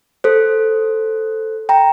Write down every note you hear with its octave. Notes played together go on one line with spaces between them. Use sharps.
A4 C5
G5 A#5